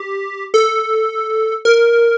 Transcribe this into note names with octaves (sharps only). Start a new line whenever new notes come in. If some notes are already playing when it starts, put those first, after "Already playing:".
Already playing: G4
A4
A#4